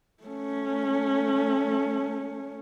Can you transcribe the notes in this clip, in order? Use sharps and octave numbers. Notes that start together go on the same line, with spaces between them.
A3 C#4